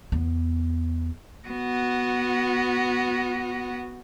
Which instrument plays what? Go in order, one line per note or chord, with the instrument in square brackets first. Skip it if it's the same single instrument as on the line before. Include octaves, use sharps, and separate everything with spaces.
[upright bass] E2 B3
[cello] B3 F#4